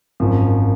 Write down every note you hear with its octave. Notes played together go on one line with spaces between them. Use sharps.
G#1 F#2 F3